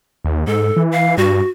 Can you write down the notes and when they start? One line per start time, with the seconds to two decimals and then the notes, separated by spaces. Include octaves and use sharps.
0.24 D#2
0.47 G#2 A4
0.77 E3
0.92 F5
1.18 G2 F#4